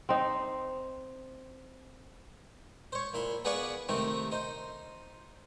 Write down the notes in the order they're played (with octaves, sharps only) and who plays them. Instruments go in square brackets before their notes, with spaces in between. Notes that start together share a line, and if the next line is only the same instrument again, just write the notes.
[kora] C4 D#4
[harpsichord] C5 C#5
A#2 E4 C6
B3 G#4 B4 D5 F5 C#6
C3 D#3 A3 C4 D#4
D#4 C5